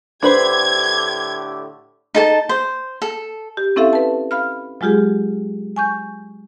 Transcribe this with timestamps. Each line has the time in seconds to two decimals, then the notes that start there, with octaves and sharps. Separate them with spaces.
0.23 A2 D3 D4 G4 B4 C5 G#6
2.15 D#4 A4 A5
2.49 C5
3.02 A4
3.57 G4
3.76 C4 C#4 E4 A4 E5 F5
3.93 B4 A5
4.31 F5 B5 F6
4.81 F#3 G#3 F4 G4 G#4
5.76 G#5 C#6 G6